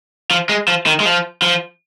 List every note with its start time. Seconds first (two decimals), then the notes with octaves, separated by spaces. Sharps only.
0.31 F3
0.49 G#3
0.68 F3
0.86 D#3
1.00 G#3
1.05 F3
1.42 F3